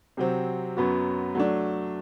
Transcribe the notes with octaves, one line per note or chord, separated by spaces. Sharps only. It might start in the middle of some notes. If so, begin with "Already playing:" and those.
C3 F#3 C4
F#2 F#3 B3 F#4
F#3 A3 D4